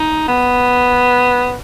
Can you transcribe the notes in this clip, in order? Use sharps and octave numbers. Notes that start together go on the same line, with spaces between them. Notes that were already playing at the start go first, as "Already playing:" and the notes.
Already playing: D#4
B3